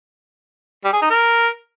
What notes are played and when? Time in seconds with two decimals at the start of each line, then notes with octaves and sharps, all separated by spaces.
0.85 G3
0.93 G#4
1.02 D#4
1.10 A#4